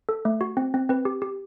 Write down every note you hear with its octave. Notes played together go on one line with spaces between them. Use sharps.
A4
A3
F#4
C4
C4
C4 B4
G4
G4